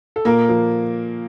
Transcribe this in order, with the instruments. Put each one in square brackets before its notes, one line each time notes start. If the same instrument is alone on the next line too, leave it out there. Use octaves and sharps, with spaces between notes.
[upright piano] A4
A#2 A#3 A#4
F3